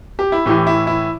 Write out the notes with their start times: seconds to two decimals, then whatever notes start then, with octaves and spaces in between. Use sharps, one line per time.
0.19 G4
0.32 E4
0.46 A2 E3 G4
0.67 E4
0.87 E4